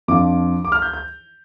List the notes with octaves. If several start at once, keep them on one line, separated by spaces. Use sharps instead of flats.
F2 F3 D4 F4 D6
D6
F6
G6
G6